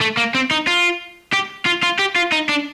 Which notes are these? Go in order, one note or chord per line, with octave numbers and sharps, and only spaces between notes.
A3
A#3
C4
D#4
F4
G4
F4
F4
G4
F4
D#4
D4